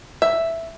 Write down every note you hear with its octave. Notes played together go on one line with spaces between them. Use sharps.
E5